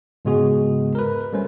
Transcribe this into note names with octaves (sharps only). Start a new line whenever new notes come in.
G#2 C#3 G#3 B3 F#4 G#4
A#4 B4
G3 A3 C#4 C5